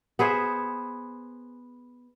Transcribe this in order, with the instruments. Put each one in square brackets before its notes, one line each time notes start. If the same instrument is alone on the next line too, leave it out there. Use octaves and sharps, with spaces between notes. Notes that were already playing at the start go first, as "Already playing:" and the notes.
[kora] B3 G#4 C5 E5